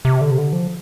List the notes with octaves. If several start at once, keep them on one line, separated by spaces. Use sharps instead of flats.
C3
D3
C3
D3
F3